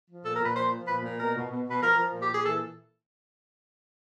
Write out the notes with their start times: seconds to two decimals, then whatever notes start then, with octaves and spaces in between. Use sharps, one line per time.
0.09 F3
0.25 A#2 A4
0.36 A#4
0.41 A#2 B4
0.56 F3 C5
0.73 F3
0.88 A#2 B4
1.04 A#2
1.20 B2 A#4
1.36 B2
1.51 B2
1.67 B2 B4
1.82 F3 A#4
1.98 F3
2.14 A#2
2.22 G4
2.29 A#2
2.35 G#4
2.46 E3 A4